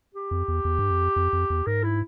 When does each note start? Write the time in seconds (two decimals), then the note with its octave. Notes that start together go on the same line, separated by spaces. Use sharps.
0.14 G4
0.31 F2
0.48 E2
0.65 E2
0.79 G2
0.91 F2
1.16 F2
1.33 F2
1.50 E2
1.67 G#2 A#4
1.83 E4